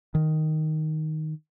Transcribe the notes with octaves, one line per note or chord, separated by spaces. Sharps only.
D#3